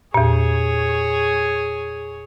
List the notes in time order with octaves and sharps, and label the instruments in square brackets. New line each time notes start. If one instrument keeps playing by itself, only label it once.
[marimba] E2 A#2 [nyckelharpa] G#4 C#5